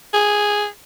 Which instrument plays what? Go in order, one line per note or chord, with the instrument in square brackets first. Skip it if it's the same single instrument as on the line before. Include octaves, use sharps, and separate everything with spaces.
[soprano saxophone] G#4